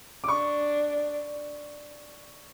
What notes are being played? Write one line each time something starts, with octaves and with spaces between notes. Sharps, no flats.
D6
D4 C#6